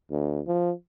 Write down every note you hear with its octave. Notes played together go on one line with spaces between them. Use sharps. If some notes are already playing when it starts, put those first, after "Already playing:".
D2
F3